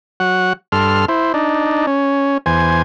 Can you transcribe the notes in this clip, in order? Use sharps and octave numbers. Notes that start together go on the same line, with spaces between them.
F#3 F#5
G2 A4 C6 F6
E4 C5
D4 D#4
C#4
E2 C5 G#5